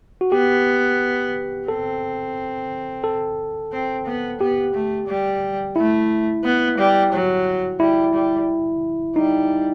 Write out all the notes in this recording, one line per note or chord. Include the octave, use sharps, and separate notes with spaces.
F#4
B3 G4
C4 A4
A4
C4
B3
B3 G4
A3
G3
A3 E4
B3
G3
F#3
G3 E4
G3
G3 D#4